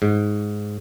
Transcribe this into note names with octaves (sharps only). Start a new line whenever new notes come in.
G#2